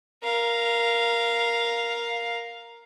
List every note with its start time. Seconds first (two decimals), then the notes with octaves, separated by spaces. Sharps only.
0.23 A#4 F5